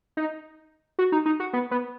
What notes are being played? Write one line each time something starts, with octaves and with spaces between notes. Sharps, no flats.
D#4
F#4
D#4
D#4
F#4
B3
B3